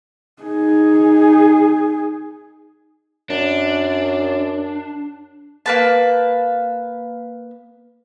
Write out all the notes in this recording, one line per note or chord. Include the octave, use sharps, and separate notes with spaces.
D#4 G#4
F#2 D4
A#3 B4 A5